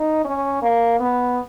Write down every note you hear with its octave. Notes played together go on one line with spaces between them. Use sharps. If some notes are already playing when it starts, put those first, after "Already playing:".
Already playing: D#4
C#4
A#3
B3